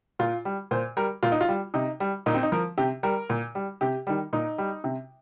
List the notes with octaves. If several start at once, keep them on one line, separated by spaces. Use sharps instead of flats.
A#2 F4
G3
A#2 C5
G3 A#4
A#2 F4
D#4
F4
G3
C3 D#4
G3
A#2 D#4
C4
D#4
F3 A#4
C3 G4
G3 A#4
A#2
G3
C3 G4
D#3 G3
A#2 D#4
G3
C3